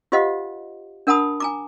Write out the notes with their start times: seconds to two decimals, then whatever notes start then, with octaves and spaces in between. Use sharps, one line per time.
0.12 F4 G4 C5 D#5 F5 F#5
1.07 D4 A#4 F#5 A5 B5 D#6
1.40 G#5 A#5 D6